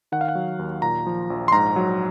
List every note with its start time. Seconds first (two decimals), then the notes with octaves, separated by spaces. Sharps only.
0.12 D#3 F#5
0.21 F5
0.28 F#5
0.35 F#3
0.59 D#2
0.82 A#2 A#5
1.07 F3
1.30 A#1
1.48 C6
1.52 G#2 A#5
1.76 F#3